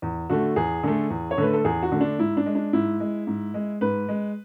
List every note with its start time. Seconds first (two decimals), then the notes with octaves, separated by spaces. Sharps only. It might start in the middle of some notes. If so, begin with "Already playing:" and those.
0.02 E2
0.30 D3 A3 F#4
0.56 E2 G#4
0.83 D3 A3
1.10 E2
1.31 C#5
1.38 D3 A3 B4
1.53 A4
1.65 E2 G#4
1.83 F#4
1.92 D3 A3
2.01 D4
2.19 G#2 E4
2.37 D4
2.46 G#3
2.55 D4
2.73 G#2 E4
3.00 G#3
3.27 G#2
3.54 G#3
3.81 G#2 B4
4.09 G#3